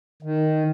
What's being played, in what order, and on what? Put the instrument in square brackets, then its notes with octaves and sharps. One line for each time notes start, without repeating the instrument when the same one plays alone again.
[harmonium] D#3